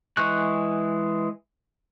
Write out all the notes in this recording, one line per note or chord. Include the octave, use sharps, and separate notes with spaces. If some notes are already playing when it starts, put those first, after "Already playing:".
E3 G#3 C#6 F#6